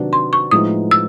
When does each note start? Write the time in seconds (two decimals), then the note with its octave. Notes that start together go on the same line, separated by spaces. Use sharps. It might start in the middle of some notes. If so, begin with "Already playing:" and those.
Already playing: C3 D#3 F#3 B3 D4
0.13 C6
0.33 C#6
0.51 A2 F3 G#3 B3 D#4 D#6
0.91 E6